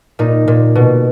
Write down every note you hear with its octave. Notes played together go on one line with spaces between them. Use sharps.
A#2 D#4
A#2
B2